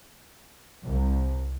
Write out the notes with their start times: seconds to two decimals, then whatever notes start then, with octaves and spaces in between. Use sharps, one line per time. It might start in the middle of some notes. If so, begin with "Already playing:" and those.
0.85 C2